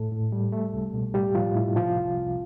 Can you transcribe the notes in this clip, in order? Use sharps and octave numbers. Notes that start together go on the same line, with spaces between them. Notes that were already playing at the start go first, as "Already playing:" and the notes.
Already playing: A2 A3 A4
A2
G3
A3
C2
B2
A2 G3 G4
A2 F3 F4
A2 E4
C3 F3 F4
C2
C2